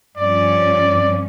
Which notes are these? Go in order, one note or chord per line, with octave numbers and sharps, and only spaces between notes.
G2 F3 C#4 D5